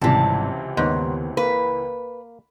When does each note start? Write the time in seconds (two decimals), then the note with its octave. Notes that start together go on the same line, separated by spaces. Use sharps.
0.02 G#1 C#2 C3 E3 G3 A5
0.77 D#2 G#2 B3 C#5
1.37 A#3 B4